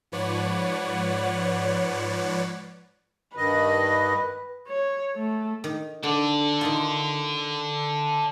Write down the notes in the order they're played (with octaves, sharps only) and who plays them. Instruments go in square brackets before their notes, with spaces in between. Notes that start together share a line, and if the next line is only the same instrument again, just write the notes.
[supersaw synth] G#2 F3 B4 C#5 D5 F#5
[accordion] G2 D#3 D#5 [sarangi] B4
[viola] C#5
A3
[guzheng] D#3
[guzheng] D3 [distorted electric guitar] A4 D5
[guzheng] D#3 D#4 F4